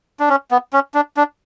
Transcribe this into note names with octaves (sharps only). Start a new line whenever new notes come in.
D4
C#4
B3
C#4
D4
D4